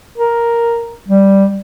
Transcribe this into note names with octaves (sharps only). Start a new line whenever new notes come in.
A#4
G3